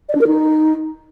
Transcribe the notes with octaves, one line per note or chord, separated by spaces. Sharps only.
D5
D4
A#4
D#4